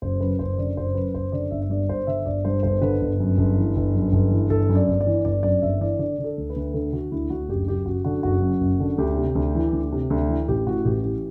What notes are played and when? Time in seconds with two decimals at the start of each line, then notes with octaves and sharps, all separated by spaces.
0.02 F#1 C5
0.21 F#2 B4
0.39 F#1 C5
0.57 D3 D5
0.77 F#1 C5
0.95 F#2 B4
1.14 F#1 C5
1.32 D3 D5
1.51 G1 E5
1.62 E5
1.70 G2 D5
1.89 G1 C5
2.07 D3 E5
2.26 G1 D5
2.45 G2 C5
2.63 G1 C5
2.82 D3 B4
3.01 G1
3.20 F#2
3.38 G1
3.57 E3
3.76 G1
3.94 F#2
4.12 G1
4.31 E3
4.50 G1 A4
4.69 F#2
4.75 D5
4.88 G1
5.01 D5
5.06 E3
5.25 G1 D5
5.43 F#2 D5
5.62 G1 E5
5.80 E3 D5
5.99 D3 D5
6.19 D3
6.24 A4
6.38 D2
6.50 B4
6.56 D2
6.74 D3 A4
6.93 D3 F#4
7.12 D2 E4
7.30 D2 F#4
7.48 F#1 G4
7.68 F#2 G4
7.86 F#1 F#4
8.05 D3 F#4
8.23 F#1 F#4
8.42 F#2
8.61 F#1
8.80 D3
8.98 D2 G4
9.17 C3
9.35 D2
9.55 E3
9.73 D2
9.92 C3
10.10 D2
10.29 E3
10.48 A1 G4
10.67 A2 F#4
10.85 A1 G4
11.03 E3 G4